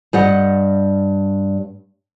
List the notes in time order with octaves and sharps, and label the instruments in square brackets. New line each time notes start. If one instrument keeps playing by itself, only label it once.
[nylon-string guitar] G2 G3 D#5 F#5